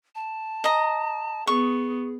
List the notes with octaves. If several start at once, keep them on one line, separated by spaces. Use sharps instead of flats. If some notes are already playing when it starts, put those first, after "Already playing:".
A5
D#5 A#5
B3 G#4 C#6